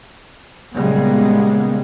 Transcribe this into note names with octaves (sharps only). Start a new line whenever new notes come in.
A#2 C#3 G3 G#3 A#3 B3